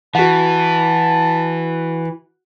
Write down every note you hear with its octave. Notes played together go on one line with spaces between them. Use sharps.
E3 F#4 F#5 A5